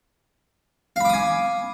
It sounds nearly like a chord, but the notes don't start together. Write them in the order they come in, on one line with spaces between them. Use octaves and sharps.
F5 B5 D6 D#6 G#5